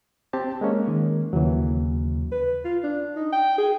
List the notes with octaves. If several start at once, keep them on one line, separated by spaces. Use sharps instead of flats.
C4 G4 A5
G#3 A#3 C#4
D#3
D#2 C#3 E3 F#3
B4
F4
D4
D#4
G5
G#4